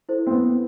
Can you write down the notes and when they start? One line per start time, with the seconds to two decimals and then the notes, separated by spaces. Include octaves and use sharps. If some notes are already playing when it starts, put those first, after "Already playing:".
0.09 E4 A4 C5
0.27 C4
0.31 B3